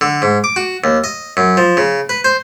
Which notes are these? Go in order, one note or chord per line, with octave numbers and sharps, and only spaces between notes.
D3
G#2
D6
F#4
D#2
D#5
F#2
F3
C#3
B4
C5